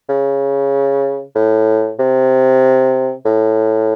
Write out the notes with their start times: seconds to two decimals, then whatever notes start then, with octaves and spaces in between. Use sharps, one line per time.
0.09 C#3
1.35 A2
2.00 C3
3.26 A2